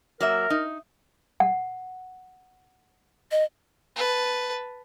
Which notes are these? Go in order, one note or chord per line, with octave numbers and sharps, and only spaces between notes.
F#3 A#3 A#4 E5
D#4
F#5
D#5
B4 A5